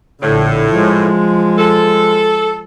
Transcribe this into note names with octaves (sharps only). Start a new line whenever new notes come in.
A#1 A2 D3
F3 G#3
A4